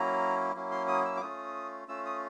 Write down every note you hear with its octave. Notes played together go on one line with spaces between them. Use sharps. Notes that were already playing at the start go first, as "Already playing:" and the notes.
Already playing: F#3 A#3 C#4 E4 A#5
F#3 A#3 C#4 E4
C6
D#6
E6
D6
A3 C#4 F4 D#6
A3 C#4 F4 E6
D#6